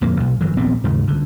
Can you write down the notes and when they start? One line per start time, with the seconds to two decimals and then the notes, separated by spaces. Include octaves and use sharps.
0.01 D1 F2 A#3
0.20 B1
0.41 G1 E3 F#3
0.57 D#1 A#1 B3 C4
0.84 D#2 G#2 C#3
1.07 C2 D3